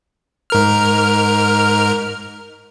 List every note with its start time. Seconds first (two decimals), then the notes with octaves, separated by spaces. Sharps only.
0.50 G#2 A#4 F6